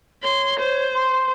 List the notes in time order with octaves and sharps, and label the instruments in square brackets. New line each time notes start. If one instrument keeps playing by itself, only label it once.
[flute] C#5 [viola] C6
[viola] C5
[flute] C6